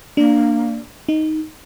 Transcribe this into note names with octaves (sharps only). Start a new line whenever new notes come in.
A#3 D4
D#4